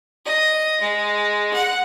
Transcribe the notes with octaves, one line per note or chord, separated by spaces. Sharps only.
D#5
G#3
F#5